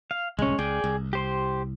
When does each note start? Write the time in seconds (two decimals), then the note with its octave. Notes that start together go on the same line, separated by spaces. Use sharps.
0.11 F5
0.39 D1 C2 G#3 C#4
0.59 C#2 G#4 D5 G5
0.84 C2
1.13 G4 C5 C6